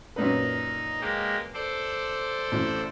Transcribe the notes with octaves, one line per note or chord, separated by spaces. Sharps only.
F#2 A#2 D#4 B4
G#3 A#3 G4
A4 C5 D5
A1